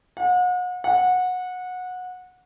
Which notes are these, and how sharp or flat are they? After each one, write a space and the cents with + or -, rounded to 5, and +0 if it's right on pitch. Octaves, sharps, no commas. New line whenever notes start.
F#5 -40
F#5 -20